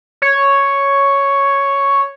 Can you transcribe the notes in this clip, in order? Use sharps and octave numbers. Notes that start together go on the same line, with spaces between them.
C#5